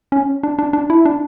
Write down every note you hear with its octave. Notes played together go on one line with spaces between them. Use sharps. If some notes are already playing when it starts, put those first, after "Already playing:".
C#4
D4
D4
D4
E4
D4